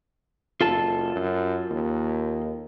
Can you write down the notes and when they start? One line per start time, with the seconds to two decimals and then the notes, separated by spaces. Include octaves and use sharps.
0.61 F#1 F4 A4 A5
1.15 F#2
1.70 D#2